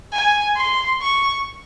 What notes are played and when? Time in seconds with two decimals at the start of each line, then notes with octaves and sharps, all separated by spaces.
0.13 G#5
0.56 C6
1.01 C#6